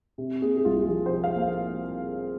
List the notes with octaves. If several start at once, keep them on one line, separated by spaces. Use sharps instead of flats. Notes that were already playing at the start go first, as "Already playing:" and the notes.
C3
A#3 G#4
G#4
C2 F4
F3 G#4
C5
C3
F5
A#3
F5